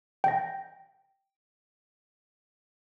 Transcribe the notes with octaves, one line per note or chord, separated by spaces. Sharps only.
G5 A#6